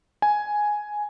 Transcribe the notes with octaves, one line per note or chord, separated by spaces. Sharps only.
G#5